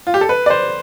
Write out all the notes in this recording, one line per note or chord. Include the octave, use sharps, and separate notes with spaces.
F4
G4
A4
B4
D5
C5